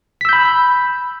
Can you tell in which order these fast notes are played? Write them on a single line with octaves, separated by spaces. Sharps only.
B6 E6 G6 B5